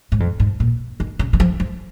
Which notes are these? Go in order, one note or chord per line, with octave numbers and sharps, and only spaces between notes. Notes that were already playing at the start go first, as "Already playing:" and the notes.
G#2
F2
G#2
A#2
D#3
C#3
D#3
F3
F3